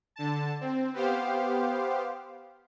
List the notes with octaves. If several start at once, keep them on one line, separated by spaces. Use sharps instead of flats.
D3 A5
C4
B3 G4 C5 F5